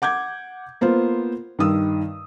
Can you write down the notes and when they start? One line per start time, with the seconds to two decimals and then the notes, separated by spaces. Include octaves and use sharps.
0.02 F#5 D6 G6 G#6
0.81 A#3 B3 F4 C5
1.59 G2 D#3 D#6 E6